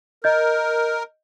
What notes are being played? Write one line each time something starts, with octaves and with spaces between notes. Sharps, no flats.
A#4 D#5 G6